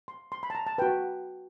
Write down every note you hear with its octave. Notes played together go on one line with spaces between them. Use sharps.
C6
C6
B5
A5
A#5
A5
F#4 B4 G5